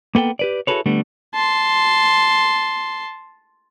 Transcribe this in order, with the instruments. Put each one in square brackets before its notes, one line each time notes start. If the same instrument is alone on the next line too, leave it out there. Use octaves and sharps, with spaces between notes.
[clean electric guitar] A#3 B3 A4 G5
G4 B4 D5
E4 F#4 G#4 A4 B4 C#5
D3 G3 A3 B3
[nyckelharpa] A5 C6